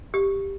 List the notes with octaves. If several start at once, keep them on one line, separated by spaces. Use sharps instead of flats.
G4